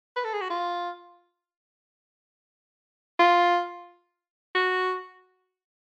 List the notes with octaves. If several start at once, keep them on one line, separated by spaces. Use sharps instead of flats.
B4
A4
G#4
F#4
F4
F4
F#4